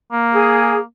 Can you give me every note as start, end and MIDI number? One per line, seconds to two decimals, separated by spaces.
0.12 0.83 58
0.32 0.78 68